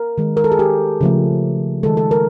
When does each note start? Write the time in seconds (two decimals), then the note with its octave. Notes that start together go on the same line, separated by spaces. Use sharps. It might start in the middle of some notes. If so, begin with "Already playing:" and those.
Already playing: A#4
0.18 D#3 G#3
0.37 A#4
0.44 A4
0.52 G#4
0.59 G4
1.01 C#3 F3 A3
1.83 D#3 G#3 A4
1.97 A4
2.11 A#4